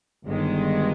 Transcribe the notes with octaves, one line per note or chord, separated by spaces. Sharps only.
G1 G2 D#3 G#3